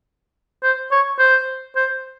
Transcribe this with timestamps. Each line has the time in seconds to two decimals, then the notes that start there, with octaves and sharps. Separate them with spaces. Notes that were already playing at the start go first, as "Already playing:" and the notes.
0.63 C5
0.92 C#5
1.19 C5
1.76 C5